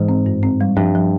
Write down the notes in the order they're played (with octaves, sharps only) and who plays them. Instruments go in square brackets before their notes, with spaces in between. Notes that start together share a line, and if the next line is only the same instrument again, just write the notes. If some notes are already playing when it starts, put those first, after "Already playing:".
Already playing: [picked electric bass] G#2 [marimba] E3
[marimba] C4
G2
C4
G3
[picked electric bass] G2 [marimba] F3
[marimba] F3